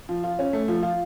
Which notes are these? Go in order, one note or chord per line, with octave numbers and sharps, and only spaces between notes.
F3
F4
C#4
A3
F3
F4